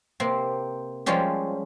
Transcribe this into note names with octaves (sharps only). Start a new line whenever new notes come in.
C3 A#3 C4
F3 G3 G#3 C#4 G4